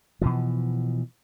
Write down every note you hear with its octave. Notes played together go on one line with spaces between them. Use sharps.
B2 E3 F3